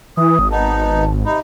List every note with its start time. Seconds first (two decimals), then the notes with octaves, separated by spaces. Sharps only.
0.17 E3 D#6
0.39 G#1
0.51 B3 D#4 A5
1.26 C3 D#4 B5